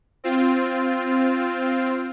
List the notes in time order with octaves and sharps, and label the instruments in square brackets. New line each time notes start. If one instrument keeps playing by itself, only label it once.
[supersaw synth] C4 F4